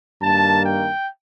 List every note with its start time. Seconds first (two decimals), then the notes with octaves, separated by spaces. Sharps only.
0.22 G2 D#3 A#3 A5
0.64 G5